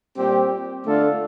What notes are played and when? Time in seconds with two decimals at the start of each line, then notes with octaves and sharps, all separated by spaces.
0.18 A#2 G3 C4 G4
0.85 D3 A3 D4 F4 A4